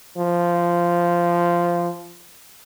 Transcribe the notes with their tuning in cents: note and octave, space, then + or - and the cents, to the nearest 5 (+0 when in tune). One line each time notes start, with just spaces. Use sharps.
F3 -10